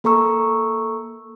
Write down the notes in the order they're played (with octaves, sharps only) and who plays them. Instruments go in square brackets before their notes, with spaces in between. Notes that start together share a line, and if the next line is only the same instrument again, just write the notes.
[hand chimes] A#3 A4 A#5 C#6 E6